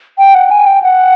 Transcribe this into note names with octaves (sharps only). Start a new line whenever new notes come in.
G5
F#5
G#5
G5
F#5